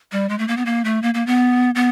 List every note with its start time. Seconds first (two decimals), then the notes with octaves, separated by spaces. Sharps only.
0.12 G3
0.29 G#3
0.39 A3
0.48 A#3
0.57 B3
0.66 A#3
0.85 A3
1.03 A#3
1.14 A#3
1.27 B3
1.75 B3